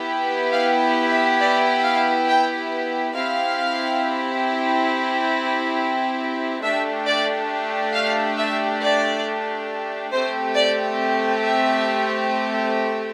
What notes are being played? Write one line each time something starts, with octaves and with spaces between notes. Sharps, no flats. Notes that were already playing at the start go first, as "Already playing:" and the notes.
Already playing: B3 E4 G4
F5
E5
D5
F5
G5
C4 E4 G4 F5
A3 D4 G4 E5
D5
F5
E5
D5
A3 C4 G4 C5
D5
E5